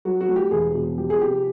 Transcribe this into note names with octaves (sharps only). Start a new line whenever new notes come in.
F#3 F#4
F#4
A3
G4
E1 G#4
B2
F3 G4
G#4
C3 G4